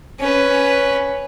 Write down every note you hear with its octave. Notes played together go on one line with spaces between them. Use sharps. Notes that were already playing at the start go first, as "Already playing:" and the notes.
C#4 B4